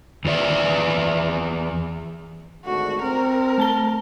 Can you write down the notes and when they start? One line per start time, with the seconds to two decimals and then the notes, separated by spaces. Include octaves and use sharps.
0.25 E2 E3 D5 E5
2.65 G#1 D3 A3 F#4
3.02 C4 A#4
3.58 A3 A5 G7